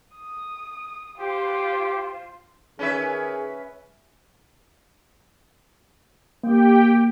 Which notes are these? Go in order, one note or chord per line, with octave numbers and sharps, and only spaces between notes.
D#6
F4 G4 C5
D#3 C#4 G#4 B4 E5
A#3 G4 G5